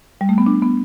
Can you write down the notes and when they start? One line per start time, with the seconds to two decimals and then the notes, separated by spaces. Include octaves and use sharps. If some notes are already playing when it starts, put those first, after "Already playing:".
0.21 G3
0.29 A3
0.38 B3
0.46 D4
0.62 B3